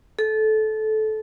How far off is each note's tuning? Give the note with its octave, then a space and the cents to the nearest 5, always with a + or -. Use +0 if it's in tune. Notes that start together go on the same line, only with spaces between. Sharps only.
A4 -20